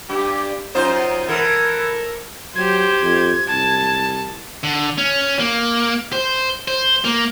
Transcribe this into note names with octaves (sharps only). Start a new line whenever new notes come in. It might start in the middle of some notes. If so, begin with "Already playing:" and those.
G2 G4
F#2 D#4 F4 C5
E3 A4 A#4
F#3 G4 C5 G#6
F2
C2 A5
D3
C#4
A#3
C5
C5
A#3